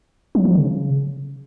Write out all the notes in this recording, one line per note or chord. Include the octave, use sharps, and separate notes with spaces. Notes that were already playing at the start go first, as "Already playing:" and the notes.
F#3
F3
C#3